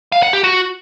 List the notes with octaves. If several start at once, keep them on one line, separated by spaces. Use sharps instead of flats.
F5
F#5
G4
F#4